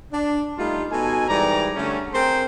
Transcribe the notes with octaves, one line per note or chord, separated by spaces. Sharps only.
D4
G3 A3 D#4 F4
B2 D#4 A4 G#5
G#2 E3 G3 D5 A#5
D3 A3 C#4
C4 G#4 A#4 C5 G5 C6